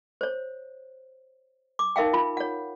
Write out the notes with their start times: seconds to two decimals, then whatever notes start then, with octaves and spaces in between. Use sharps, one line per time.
0.21 C5 C#5
1.79 D6
1.96 D#4 A#4 E5 F5 G5
2.13 F4 B5
2.37 C#5 F#5